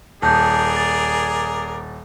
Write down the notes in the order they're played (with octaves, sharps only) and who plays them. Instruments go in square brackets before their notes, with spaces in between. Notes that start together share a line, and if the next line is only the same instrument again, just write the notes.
[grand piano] D#1 [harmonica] G#4 A#4 D5 [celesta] A5 G6
[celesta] A6